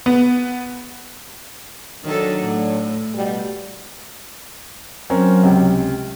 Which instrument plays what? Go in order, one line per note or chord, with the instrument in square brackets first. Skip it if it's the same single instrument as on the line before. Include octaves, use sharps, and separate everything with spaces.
[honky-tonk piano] B3
[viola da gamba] D#3 A4 [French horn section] F#3 D4
[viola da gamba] A2
[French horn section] B2 G3
[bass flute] F#3 [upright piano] C4 C#4 A#4
[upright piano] C#2 C3